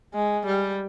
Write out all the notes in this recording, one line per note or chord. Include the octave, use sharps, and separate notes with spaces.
G#3
G3